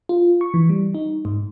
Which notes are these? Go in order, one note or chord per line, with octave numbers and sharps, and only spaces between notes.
F4
C#6
E3
G3
D#4
G#2